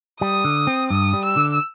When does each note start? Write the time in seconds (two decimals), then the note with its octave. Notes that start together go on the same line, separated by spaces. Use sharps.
0.21 G3 D#6
0.44 D3
0.67 C4
0.90 G2 D#6
1.13 G3
1.25 E6
1.36 D3